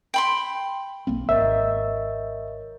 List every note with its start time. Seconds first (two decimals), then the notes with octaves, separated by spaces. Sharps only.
0.14 G5 B5 C6
1.07 B1 A#3 C4
1.29 G#1 A#4 C#5 D#5 E5